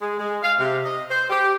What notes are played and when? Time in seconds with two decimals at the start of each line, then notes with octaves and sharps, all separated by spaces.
0.01 G#3
0.19 G#3
0.42 F5
0.59 C3
0.85 D#5
1.09 C5
1.30 G4